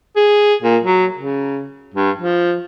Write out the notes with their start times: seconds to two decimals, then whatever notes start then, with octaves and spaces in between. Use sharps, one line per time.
0.16 G#4
0.63 A#2
0.83 F#3
1.17 C#3
1.94 G2
2.18 F3